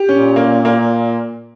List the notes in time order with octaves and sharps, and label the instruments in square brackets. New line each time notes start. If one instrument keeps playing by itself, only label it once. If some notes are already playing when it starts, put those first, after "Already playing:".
Already playing: [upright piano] G4
[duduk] A#2 [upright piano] C#4
[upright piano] A#3
A#3